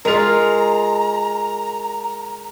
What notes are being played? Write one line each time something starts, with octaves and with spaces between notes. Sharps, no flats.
G#3 F4 A#4 A#5 F7